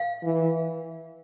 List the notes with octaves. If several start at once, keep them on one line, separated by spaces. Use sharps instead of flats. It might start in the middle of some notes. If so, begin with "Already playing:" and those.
Already playing: F5
E3